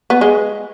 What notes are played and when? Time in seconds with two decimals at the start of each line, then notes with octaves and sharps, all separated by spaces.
0.10 B3
0.21 G#3